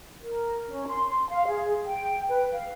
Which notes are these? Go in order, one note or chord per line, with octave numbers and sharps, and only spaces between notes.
A#4
C#4
C6
F5
G#4
G5
B4
F5